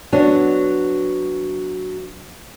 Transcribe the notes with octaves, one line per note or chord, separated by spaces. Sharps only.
F#3 B3 D4